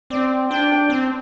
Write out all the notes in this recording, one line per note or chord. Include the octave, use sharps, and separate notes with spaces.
C4 D5
D4 G5
C4